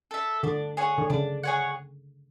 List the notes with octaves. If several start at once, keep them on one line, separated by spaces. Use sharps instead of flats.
A4 E5
D3 D4
G#4 C#5 F#5
D3
C#3 D4
G#4 C#5 F#5